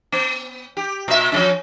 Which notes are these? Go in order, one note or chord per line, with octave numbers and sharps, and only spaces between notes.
B3
G4
A#2 E5
F3 G3 C#4